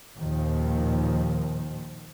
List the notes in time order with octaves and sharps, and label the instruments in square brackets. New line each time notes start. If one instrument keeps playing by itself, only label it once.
[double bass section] D#2 A#2 D#3 F3